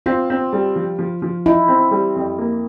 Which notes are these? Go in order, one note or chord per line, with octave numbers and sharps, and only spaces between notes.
C4 F4
C4
G3
F3
F3
F3
D#4 E4
C4
G3
F2
A#3